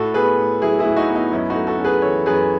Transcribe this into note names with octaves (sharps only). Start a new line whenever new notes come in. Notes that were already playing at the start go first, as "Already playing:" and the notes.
Already playing: A2 F#4 A4
B3 G#4 B4
A2
F#3 E4 G#4
E4 G#4
A2
D#4 F#4
B3
D#4
F#2 C#4 E4
D#4 F#4
A3
F#4 A4
C#4
G#4 B4
E3 A4 C#5
F#2 G#4 B4